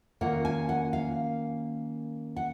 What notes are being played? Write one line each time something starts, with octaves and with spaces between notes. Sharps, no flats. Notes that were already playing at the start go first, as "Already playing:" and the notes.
D#3 A#3 C#4 F4 F#5
G#5
F#5
F5
F#5